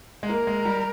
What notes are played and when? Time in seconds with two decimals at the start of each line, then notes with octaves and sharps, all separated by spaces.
0.23 G#3
0.29 A#3 A#4
0.47 G#3
0.65 G3